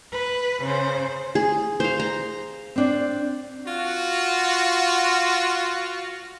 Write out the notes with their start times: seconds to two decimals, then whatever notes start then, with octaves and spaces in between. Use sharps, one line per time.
0.12 B4
0.62 C#3 C5
1.35 G#4
1.80 C5 F5
2.00 A#5
2.76 C4 D4 D5
3.66 F4 F#4